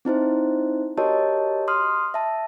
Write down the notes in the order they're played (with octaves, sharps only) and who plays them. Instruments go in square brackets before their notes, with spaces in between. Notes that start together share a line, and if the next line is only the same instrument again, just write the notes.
[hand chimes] C4 D#4 E4 C5
F#4 G4 A#4 C#5 D#5 A5
C6 D#6 F6
E5 A5